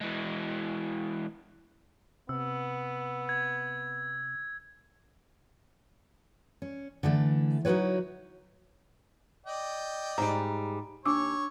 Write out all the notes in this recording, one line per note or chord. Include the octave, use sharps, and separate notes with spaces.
E3 G#3
C3 B3 E6
G#6
C#4
D3 E3 A3
F#3 D#4 E4 F#4 B4 C#5
D5 D#5 G5
G#2 G3 A#5
D#2 D4 C#5 D6 E6